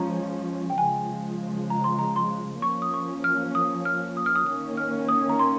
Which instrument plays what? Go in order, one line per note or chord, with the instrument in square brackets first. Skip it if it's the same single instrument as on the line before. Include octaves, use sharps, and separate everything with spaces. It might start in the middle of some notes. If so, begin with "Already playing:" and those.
Already playing: [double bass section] F3 G#3 C#4 [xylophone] A#5
[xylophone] G5
[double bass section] C#3 F3 G#3 [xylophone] G#5
[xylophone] A#5
C6
A#5
C6
[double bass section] F3 A#3 C#4 [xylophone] C#6
[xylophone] D#6
C#6
F6
D#6
F6
D#6
F6
D#6
[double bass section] D#3 A#3 C#4 [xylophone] D#6
[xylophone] F6
D#6
A#5
C6